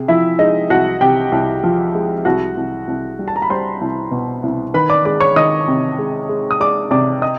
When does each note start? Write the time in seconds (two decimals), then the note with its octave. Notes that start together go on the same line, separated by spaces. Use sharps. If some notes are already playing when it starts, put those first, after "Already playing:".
Already playing: C3 G#4
0.08 F3 E4 E5
0.39 G#3 D#4 D#5
0.70 C2 F#4 F#5
1.01 C3 G4 G5
1.32 C2
1.64 F3
1.95 G#3
2.25 C2 F#4 F#5
2.57 C2
2.88 C2
3.19 G3
3.28 A5
3.36 A#5
3.42 B5
3.50 G3 C5 C6
3.81 C2
4.11 B2
4.43 C2
4.74 D#3 B4 B5
4.90 D5 D6
5.05 G#3 D5 D6
5.20 C#5 C#6
5.36 D#3 D#5 D#6
5.68 C3
5.99 G#3
6.29 G#3
6.51 D#6
6.60 G#3 D5 D6
6.91 C3 D5 D6
7.22 D#5 D#6